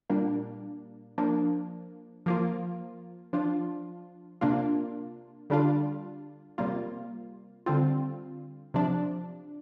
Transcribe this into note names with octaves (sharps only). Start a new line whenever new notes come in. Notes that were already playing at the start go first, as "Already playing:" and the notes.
A#2 G3 A#3 D4
F3 A#3 D4
F3 A#3 F4
F3 D4 F4
C3 A#3 D4 F4
D3 G3 D4 F4
C3 G3 A#3 F4
D3 G3 C4 F4
C3 F3 D4